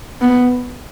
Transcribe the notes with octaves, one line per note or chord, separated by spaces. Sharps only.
B3